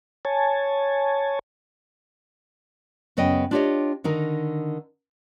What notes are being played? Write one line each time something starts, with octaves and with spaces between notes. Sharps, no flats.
C#5 G#5 A5
F#2 C#3 B3 C#5 D#5 G5
D4 F4 G4 C5 C#5 D#5
D3 D#3 D#4 A#4